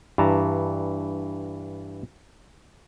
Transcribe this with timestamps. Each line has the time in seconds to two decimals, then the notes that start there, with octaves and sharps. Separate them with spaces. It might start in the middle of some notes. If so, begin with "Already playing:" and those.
0.18 G2 E3 A5 A#5